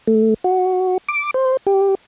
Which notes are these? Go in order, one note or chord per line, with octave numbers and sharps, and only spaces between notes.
A3
F#4
D6
C5
G4